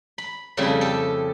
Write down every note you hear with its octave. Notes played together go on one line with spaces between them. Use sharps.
B5
F2 C#3 G3 A3 E4
G4 A4